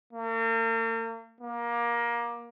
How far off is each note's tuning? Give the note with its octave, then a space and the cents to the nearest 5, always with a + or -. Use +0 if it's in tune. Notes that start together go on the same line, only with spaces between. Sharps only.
A#3 -45
A#3 +20